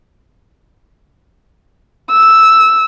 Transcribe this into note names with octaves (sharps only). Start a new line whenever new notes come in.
E6